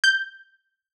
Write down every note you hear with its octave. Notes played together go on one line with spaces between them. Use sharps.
G6